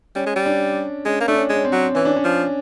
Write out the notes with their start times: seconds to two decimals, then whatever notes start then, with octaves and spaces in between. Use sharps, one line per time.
0.15 G3 C#4
0.26 G#3
0.36 G3
0.46 D4
1.05 G#3 C#4
1.21 A#3
1.28 A3 D4
1.35 C#4
1.49 G#3 C#4
1.65 C4
1.72 F#3
1.95 E3 C#4
2.05 D4
2.16 C#4
2.25 F3